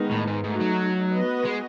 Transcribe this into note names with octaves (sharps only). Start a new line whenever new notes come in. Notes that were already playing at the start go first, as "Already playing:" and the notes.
Already playing: D#3 G#3 B3 D#4
A2
G#2
G#2 A3 D#4 F#4
F#3
B3 F#4 B4 D#5
G#3